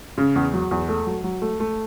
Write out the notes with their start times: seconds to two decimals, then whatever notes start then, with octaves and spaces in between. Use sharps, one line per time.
0.18 C#3
0.36 E2
0.53 F#3
0.71 E2
0.88 A3
1.07 F#3
1.24 F#3
1.42 A3
1.60 A3